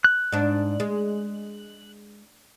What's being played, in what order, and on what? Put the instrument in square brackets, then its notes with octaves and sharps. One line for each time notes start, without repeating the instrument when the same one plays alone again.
[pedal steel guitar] F#6
[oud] G#2 D4
G#3